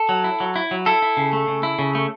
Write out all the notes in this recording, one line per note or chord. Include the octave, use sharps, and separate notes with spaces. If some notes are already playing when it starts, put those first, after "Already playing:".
Already playing: A4
F#3
E4
F#3
E4
F#3
E4 A4
E4
C#3
A3
C#3
E4
C#3
A3